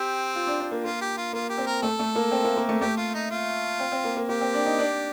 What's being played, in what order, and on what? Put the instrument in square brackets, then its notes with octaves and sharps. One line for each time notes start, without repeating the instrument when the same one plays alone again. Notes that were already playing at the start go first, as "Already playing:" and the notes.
Already playing: [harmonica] C4 [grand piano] G4
[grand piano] F4
D4
D4
A#3
[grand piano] A#3 [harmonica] F4
[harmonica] G4
F4
[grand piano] A#3 [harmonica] F4
[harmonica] G4
[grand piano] C4
[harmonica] A#4
[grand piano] A3 [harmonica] A4
[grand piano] A3
A#3
C4
A#3
A#3
A3
[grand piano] A3 [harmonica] G4
[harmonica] F4
D#4
F4
[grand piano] C4
C4
A#3
A#3
[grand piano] A#3 [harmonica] G4
[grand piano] C4
D4
D#4
D4